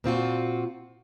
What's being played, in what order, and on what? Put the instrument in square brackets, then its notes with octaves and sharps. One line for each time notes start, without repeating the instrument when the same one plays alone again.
[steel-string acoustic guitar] A#2 C4 F4 F#4